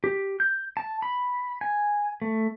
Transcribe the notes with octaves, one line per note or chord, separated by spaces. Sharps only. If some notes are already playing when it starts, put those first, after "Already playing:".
G4
G6
A5
B5
G#5
A3